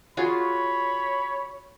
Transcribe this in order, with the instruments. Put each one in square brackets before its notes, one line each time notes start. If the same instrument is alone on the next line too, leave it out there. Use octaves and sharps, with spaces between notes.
[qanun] F4 F#4 G#4 [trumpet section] C#5 B5